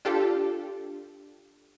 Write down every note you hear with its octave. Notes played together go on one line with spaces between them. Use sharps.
D4 F4 G4 A4